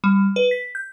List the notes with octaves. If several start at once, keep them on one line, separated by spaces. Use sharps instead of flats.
G3
B4
B6
G6